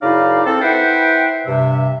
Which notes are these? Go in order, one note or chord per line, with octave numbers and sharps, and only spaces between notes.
F#2 C#3 D#4 E4 D5 F5
C4 A4
E4 B4 C5 E5 F#5 G5
G2 C3 E5